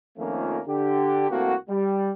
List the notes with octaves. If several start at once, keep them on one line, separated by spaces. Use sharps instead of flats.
F2 D#3 F3 A3 A#3 C#4
D3 G4
C2 A3 A#3 C4 F#4
G3